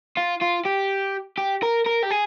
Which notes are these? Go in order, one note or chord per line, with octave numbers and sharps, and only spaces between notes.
F4
F4
G4
G4
A#4
A#4
G4
G#4